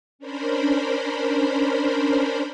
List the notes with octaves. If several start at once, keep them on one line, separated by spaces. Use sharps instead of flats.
C#4 D4 A#4 C5 B5